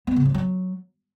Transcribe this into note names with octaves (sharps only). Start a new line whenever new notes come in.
B3
C#3
F3
F#3